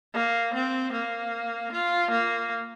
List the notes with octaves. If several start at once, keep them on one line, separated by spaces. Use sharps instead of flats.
A#3
C4
A#3
F4
A#3